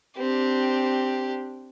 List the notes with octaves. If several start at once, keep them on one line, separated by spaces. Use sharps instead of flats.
C4 D4 G4